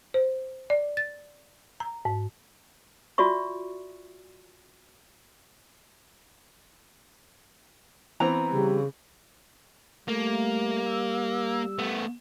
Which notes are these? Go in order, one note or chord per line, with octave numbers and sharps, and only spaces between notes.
C5
D5
A6
A#5
G#2
F4 F#4 D5 E5 C#6
E3 B3 C4 A#5
C#3 G3
G3 A3 A#3
E6
A3 B3